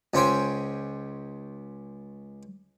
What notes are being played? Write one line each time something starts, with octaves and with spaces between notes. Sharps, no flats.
C#2 C#4 C5 G5 G#5